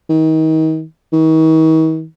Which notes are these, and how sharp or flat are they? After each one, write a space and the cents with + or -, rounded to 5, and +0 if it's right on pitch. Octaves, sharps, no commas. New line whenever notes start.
D#3 +35
D#3 +45